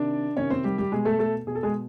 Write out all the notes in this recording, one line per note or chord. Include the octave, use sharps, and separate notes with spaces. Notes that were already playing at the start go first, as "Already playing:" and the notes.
Already playing: C3 D#3 D4 D5
C3 D#3 C#4 C#5
C4 C5
G3 G4
G3 G4
B2 G#3 G#4
A3 A4
A3 A4
B2 G#4
A4
G#3 G#4